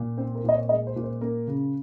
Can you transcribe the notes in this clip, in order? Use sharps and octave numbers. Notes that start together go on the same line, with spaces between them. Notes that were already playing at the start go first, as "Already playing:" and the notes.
Already playing: A#2
C4 C5
A#4
A#2 D#5
C#5
G#3 D#5
C5
A#2
C5
A#3 A#4
C#3